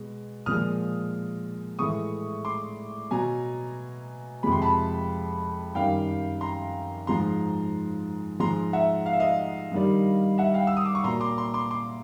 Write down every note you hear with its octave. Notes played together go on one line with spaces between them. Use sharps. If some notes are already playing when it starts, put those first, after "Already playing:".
Already playing: B2 G#3
A#2 F3 G#3 D#6 F6
A2 E3 G#3 C#6 D#6
C6 D6
B2 F#3 G#5 A#5
F2 C3 F3 G#3 B5
C6
A5 B5
F#2 D#3 G3 F5 G5
A#5 C6
G#2 F3 G#3 A#5 C6
G#2 F3 G#3 A#5 C6
E5 F#5
F5
E5
D#5 F5
G2 D#3 G3
E5 F#5
F5 G5
E6
D#6
D6
C#6
A#2 F#3 A#5 C6
C6 D6
C6 D6
C6 D6
C6 D6